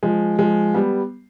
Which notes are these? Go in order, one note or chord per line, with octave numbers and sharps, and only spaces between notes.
F3 G#3
F3 G#3
G3 B3